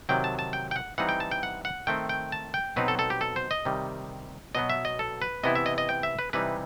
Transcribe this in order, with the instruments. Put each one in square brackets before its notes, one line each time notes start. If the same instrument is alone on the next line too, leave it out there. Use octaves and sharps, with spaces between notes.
[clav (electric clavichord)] C3 D#3 F#3 G5
A5
A5
G5
G5
F#5
E3 G3 C4 D#4 F#5
G5
A5
G5
F#5
F#5
D#3 A3 C4 G5
G5
A5
G5
B2 F#3 C4 D#4 B4
A4
A4
G4
A4
C5
D#5
C3 D#3 G3
B2 F#3 B3 D#5
E5
D#5
A4
B4
C3 E3 B3 E4 D#5
E5
D#5
D#5
G5
E5
B4
C3 E3 G3 D#4 B4